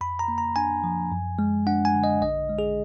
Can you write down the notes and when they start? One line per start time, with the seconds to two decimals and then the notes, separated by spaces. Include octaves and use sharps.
0.01 F2 B5
0.19 A#5
0.28 A#3
0.38 A#5
0.56 D4 G#5
0.84 F3
1.12 F#2
1.39 G#3
1.66 D4 F#5
1.85 G#5
1.94 D3
2.04 D#5
2.22 A#1 D#5
2.49 G#3
2.59 G#4